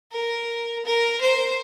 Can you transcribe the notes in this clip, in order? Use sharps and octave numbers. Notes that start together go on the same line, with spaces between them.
A#4
A#4
C5